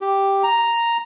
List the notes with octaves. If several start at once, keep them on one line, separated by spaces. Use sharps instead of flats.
G4
A#5